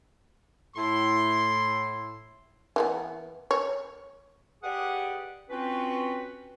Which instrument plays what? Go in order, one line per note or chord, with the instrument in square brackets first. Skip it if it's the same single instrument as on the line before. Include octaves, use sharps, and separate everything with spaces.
[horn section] A2 E4 C6
[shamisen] E3 A#3 B3
C#5
[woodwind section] G4 G#4 B4 D5 D#5 F#5
C4 C#4 F4 F#4 B4